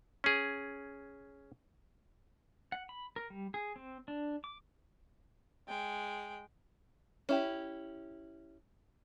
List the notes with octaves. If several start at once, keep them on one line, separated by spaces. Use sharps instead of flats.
C#4 G#4
F#5
B5
A#4
G3
G#4
C4
D4
D6
G#3 G5
C#4 E4 G4